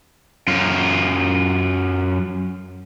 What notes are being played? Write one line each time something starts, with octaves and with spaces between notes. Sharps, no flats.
F#2 F4